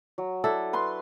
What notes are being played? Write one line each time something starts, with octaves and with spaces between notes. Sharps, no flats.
F#3
D4 E4 A4
B4 C6